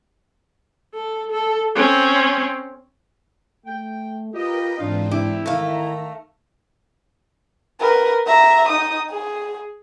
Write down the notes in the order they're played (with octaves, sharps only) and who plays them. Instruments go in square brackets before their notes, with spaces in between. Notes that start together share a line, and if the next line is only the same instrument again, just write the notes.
[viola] A4
A4
C4 C#4
[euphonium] A3 [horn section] G5
[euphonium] F4 [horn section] G4 D#5 [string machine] A#4 B4 G5
[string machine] G#2 E3 C4 [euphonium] D4 [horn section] D#4 F4
[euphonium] D4 [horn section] E4 [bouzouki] G4
[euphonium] D#3 [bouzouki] A3 F5 [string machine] A#5
[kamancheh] A#4 B4
E5 A#5
D#4 D#6
G#4